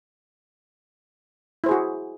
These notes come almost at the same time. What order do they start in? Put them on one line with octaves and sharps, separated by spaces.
E4 C5 G#4 F#4